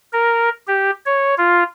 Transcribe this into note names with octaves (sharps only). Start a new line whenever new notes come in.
A#4
G4
C#5
F4